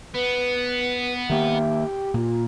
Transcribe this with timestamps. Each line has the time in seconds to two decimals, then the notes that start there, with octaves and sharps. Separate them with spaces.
0.14 B3 B4
1.30 D#3 A#3 G4 E5
2.14 A#2 F4